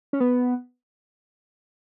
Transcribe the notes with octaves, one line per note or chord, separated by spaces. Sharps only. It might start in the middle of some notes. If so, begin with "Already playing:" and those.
C#4
B3